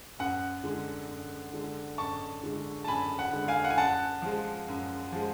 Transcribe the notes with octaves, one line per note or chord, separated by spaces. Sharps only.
F#2 F#5
D3 G#3
F#2
D3 G#3
F#2 A5 C#6
D3 G#3
A5
F#2 G#5 B5
F#5
D3 G#3
F5 G#5
F#5
G#5
F#2 F#5 A5
F3 G#3
F#2
F3 G#3